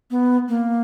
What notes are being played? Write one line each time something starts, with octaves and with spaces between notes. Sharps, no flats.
B3
A#3